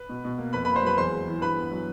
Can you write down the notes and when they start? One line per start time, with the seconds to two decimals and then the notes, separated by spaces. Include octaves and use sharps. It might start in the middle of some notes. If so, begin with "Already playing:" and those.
Already playing: B4
0.09 B2
0.25 B2
0.38 A#3
0.53 F2 B4 B5
0.65 A#3 B4 B5
0.75 C5 C6
0.82 F#3 B4 B5
0.97 E2 C5 C6
1.12 G#3
1.27 E3
1.42 G2 B4 B5
1.56 B3
1.71 F#3